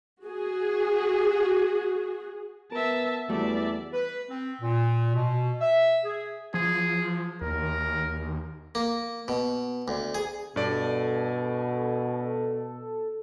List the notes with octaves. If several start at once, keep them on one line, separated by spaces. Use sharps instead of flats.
F#4 G#4
B3 A#4 E5 A5
E2 G3 A3 F#4 D5 E5
B4
C4
A#2
B2
E5
G#4
F3 G#4
D#2 A#4
A#3
B2
D2
G#4
G2 B2 A4 D5